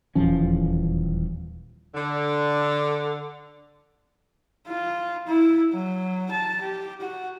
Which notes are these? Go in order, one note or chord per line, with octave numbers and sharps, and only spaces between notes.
D#1 E2 F3 C#4
D3
F4
E4
F#3
A5
G4
F#4